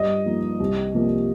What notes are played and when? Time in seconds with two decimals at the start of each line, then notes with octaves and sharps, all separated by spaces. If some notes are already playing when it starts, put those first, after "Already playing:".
Already playing: G2 D#5
0.25 F3 A#3 D#4
0.60 C2
0.94 C3 F3 A#3